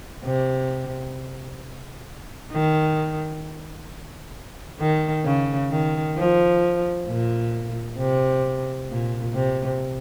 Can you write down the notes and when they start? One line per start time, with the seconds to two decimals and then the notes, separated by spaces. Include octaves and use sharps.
0.24 C3
2.52 D#3
4.80 D#3
5.25 C#3
5.70 D#3
6.16 F3
7.07 A#2
7.98 C3
8.89 A#2
9.34 C3